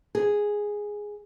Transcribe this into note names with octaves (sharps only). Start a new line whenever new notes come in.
G#4